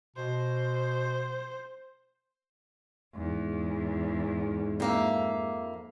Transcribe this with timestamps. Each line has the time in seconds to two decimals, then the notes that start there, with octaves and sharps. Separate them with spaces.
0.16 B2 C5
3.15 E2 G#2
4.80 F2 A#3 E5